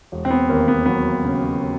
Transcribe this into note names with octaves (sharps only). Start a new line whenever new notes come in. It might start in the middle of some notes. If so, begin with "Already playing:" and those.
E1
C4
B3
D#2 A#3
B3
F#3 B3
C#3